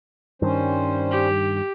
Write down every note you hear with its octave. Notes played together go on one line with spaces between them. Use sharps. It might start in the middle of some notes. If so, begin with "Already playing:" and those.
G2 D#3 G3 C#4 C5
G4